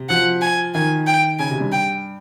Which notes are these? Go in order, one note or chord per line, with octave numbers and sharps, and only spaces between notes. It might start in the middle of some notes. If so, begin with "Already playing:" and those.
Already playing: C3
F3 F#5
G#5
D#3 G#5
G5
C#3 G#5
C3
G2
G5